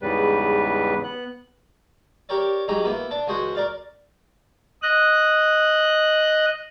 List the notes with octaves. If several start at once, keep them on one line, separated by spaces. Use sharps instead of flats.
E2 G#2 C#3 G3 B4
B3 F#6
G4 A#4 C#5 D5
G#2 F#3 D#4 G4 G#4 A#5
A#3 B3 E4
D4 D5
C#2 F#4 G#4 C5 F#5 C6
A#4 D5 F5
D#5 F#6